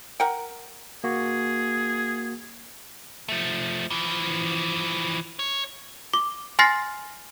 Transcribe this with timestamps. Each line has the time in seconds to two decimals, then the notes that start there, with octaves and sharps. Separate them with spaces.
0.20 A#4 F#5 G5
1.04 A#3 F#4 G#4
3.28 F3 A3
3.90 E3 F3
5.39 C#5
6.14 D6
6.59 G#5 C6 F6 A6 A#6 C7